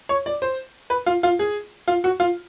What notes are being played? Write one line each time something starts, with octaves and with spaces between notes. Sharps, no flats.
C#5
D5
C5
B4
F4
F4
G#4
F4
F#4
F4